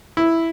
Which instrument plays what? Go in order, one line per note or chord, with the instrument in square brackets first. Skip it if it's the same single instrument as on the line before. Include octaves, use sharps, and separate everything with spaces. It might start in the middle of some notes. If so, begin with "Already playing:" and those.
[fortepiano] E4